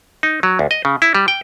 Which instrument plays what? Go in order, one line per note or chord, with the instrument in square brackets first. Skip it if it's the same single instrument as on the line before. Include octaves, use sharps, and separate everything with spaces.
[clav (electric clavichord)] D#4
F#3
D2
D#5
C#3
E4
G3
G5